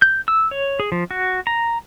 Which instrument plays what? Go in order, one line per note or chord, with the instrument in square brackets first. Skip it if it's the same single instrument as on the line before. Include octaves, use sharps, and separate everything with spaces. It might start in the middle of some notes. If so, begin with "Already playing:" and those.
[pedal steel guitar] G6
E6
C#5
G#4
F3
F#4
A#5